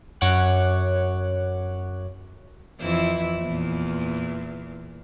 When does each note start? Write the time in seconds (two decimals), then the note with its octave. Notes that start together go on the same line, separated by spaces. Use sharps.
0.21 F#2 C#5 F#5 D6 F#6
2.80 F2 E3 E4
3.41 E2 A#2